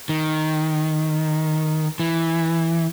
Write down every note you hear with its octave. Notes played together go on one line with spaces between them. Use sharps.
D#3
E3